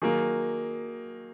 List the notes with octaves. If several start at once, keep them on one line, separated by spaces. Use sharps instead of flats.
D#3 F#3 A#3 G#4